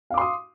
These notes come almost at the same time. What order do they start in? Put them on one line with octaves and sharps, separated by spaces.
F5 D6 C6 D#6